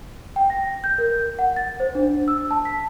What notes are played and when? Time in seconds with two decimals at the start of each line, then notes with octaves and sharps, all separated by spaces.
0.36 G5
0.50 A#6
0.84 G6
0.98 A#4
1.39 F#5
1.56 A6
1.80 C5
1.95 D4
2.28 E6
2.51 A5
2.65 B6